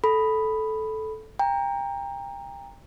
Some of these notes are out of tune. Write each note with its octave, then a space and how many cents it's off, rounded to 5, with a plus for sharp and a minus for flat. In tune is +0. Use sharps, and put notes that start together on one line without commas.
A4 -10 B5 +0
G5 +30 A#5 +0